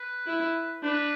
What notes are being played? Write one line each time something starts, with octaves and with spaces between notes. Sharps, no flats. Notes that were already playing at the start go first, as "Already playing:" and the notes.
Already playing: B4
E4
D4 B4